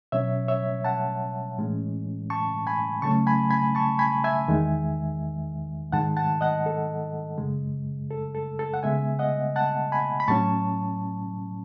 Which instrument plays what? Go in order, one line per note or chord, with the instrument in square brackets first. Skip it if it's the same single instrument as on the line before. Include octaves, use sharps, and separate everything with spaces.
[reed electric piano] B2 F#3 C#4 C#5 E5
C#5 E5
F#5 A5
A2 E3 G#3 C#4
A5 C#6
G#5 B5
C#3 F#3 A3 C#4 A5 C#6
G#5 B5
G#5 B5
A5 C#6
G#5 B5
E5 G#5
E2 D#3 G#3
G#2 D#3 G#3 F#5 A5
F#5 A5
D#5 F#5
A4
F#2 C#3 G#3
A4
A4
A4
F#5
C#3 G#3 B3 E5 G#5
D#5 F#5
F#5 A5
G#5 B5
B5
A2 F#3 C#4 A5 C#6